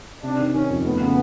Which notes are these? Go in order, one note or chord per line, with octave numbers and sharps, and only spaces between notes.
C3 D4
D#3
D#3 C#4
F2
A3 B3
C#3